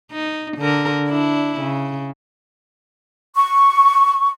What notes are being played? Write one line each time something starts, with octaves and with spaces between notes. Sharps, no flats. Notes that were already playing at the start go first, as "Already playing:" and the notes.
D#4
D3 A#4
D4 E4
C#3
C#6